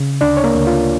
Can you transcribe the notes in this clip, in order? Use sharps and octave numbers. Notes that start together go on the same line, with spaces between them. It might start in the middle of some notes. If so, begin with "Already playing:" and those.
Already playing: C#3
D2 D4 D5
C#5
A#3 A#4
D2
F4